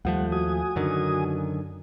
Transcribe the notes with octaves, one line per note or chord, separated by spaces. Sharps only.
D#2 F3 G3 A3 F#5
F#4 G#5 D#6
F#2 D3 D#3